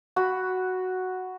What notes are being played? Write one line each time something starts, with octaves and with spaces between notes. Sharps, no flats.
F#4 B5